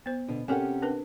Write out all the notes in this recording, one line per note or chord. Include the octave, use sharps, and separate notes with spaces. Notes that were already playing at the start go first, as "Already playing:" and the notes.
B3 C5
B2 D3
C3 C#4 G4 A4 A#4 F#5 G#5
D4 A#4 B4